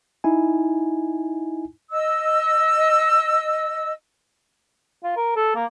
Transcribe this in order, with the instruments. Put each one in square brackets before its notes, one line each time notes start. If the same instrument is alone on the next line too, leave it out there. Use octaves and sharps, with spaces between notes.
[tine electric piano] D#4 E4 G#5
[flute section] D#5 E6
[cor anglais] F4
A#4
A4
A#3